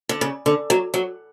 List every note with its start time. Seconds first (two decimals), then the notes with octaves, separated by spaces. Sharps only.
0.09 D3
0.21 C#3
0.46 D3
0.70 F#3
0.94 F#3